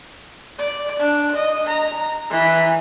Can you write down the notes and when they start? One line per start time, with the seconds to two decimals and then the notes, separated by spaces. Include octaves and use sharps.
0.59 D5
0.99 D4
1.35 D#5
1.67 A#5
2.30 E3